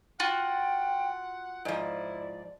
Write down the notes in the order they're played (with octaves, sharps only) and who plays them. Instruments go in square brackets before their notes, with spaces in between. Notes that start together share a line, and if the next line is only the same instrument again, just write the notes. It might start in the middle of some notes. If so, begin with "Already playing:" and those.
[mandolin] F4 F#4 [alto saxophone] F#5 [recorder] G5
[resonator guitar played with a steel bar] G#2 F3 [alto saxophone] E4 [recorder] D5